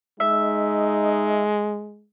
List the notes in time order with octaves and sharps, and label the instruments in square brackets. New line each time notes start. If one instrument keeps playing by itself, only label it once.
[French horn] G#3 [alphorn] D#4 [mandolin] E5